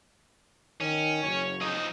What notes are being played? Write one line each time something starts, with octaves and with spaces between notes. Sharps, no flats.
D#3 C#4
F#1 C#5
F3 D#4 D#5